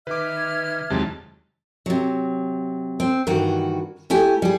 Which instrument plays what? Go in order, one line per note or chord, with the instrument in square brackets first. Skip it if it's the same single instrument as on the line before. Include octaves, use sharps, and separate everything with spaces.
[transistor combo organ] D#3 [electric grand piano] B4 D6 [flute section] E5 F6 G#6
[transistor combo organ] E2 D#3 A5 [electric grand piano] C3 F#3 G#3
[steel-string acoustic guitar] C3 F#3
C4
G2 D#3 E3 F#4
A3 E4 G4 G#5
G3 G#4